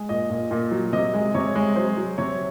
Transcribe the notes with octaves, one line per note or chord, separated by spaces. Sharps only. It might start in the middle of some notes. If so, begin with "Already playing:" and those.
Already playing: G#3
A#2 D#5
A#2
A#2
F#3
C3 D#5
G#3
C3 C#5
G#3
F#3 C5
F#3
C3 C#5